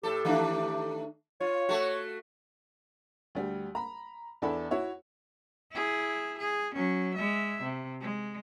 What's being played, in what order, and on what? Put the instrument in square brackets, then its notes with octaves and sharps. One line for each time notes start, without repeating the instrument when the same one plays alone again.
[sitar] A2 A4 [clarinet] G4
[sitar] D#3 A3 D4
[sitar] F4 [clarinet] C#5
[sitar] A3 F#4
[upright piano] D2 G3
A#5 B5
E2 D4 E4 A4 B5
E4 F#4 C#5 E5
[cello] E4 G#4
G#4
F#3 C#4
G#3 E5
C3
G#3